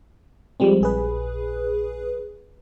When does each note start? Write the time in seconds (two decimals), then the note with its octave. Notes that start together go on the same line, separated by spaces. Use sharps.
0.60 F3 G3 G#3 C4
0.81 A#1 G#4 B4